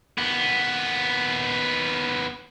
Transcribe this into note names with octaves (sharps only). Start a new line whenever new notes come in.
D#2 B3